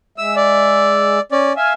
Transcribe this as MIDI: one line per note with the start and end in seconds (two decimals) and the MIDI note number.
0.18 1.19 56
0.18 1.19 76
0.18 0.35 88
0.36 1.21 74
1.32 1.53 61
1.32 1.53 74
1.56 1.73 76
1.56 1.73 77
1.56 1.73 80